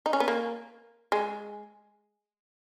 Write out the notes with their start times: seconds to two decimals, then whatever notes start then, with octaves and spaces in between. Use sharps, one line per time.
0.06 D#4
0.13 C#4
0.20 B3
0.28 A#3
1.12 G#3